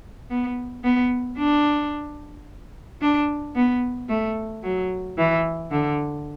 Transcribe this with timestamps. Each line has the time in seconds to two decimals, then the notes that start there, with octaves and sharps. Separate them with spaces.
0.30 B3
0.84 B3
1.38 D4
3.01 D4
3.56 B3
4.09 A3
4.63 F#3
5.18 E3
5.71 D3